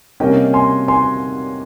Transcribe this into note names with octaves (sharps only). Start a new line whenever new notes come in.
C3 G3 A#3 C#4 D#5 G5
G#5 C6
G#5 C6